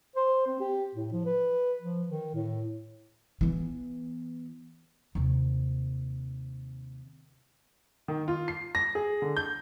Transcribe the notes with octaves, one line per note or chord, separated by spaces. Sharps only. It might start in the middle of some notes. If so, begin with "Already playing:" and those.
C5
C4
G4
A2
F3
B4
F3
D#3
A2
E3 B3
D#2 C3
D#3
F4
C7
A#6
G#4
D3
G6